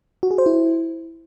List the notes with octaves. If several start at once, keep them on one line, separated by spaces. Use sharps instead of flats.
F#4
G#4
C5
E4